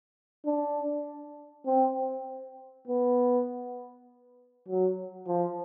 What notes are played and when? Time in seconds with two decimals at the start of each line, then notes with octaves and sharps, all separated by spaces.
0.46 D4
1.67 C4
2.88 B3
4.68 F#3
5.27 F3